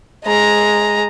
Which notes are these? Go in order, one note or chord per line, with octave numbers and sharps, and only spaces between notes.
G#3 A#5